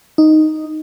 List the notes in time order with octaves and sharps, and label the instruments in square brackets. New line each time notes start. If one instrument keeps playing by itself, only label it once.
[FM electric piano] D#4